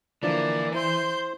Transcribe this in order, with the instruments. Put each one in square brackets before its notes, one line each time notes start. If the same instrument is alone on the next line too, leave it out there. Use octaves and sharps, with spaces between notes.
[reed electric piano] D3 F3 D4 [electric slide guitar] E3 [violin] A#3 [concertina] D5
[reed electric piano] E4 [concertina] C5 [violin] C6 G6